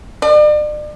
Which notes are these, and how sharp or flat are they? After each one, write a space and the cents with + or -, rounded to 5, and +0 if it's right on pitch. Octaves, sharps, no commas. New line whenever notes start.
D5 +40